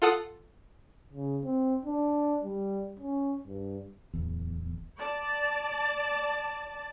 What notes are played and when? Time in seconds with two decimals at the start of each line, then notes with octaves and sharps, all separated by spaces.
0.02 F4 A4 F#5 D#6
1.13 C#3
1.44 C4
1.85 D4
2.44 G3
2.99 C#4
3.47 G2
4.14 D1 E2
4.98 D5 A5